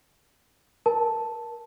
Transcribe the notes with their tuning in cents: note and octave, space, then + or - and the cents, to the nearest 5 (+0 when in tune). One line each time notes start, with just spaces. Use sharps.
A#4 +25 A5 +0